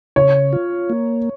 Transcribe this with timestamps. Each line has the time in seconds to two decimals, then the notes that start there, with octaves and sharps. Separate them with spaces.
0.16 C#3 C#5
0.53 F4
0.90 A#3